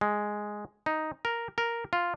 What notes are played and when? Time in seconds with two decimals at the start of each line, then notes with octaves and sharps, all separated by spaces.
0.01 G#3
0.86 D#4
1.25 A#4
1.58 A#4
1.93 F4